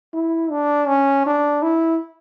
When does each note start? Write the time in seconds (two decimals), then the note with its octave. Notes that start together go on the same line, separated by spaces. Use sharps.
0.14 E4
0.51 D4
0.88 C#4
1.26 D4
1.63 E4